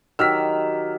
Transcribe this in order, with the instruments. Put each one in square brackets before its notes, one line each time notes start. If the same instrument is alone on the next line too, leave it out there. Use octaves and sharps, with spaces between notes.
[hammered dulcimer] D#3 [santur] F#3 G4 D#5 [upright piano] E6 F6 B6